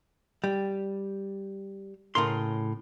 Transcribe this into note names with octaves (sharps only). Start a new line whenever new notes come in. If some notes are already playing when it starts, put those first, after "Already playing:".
G3
A2 C#3 A#4 C6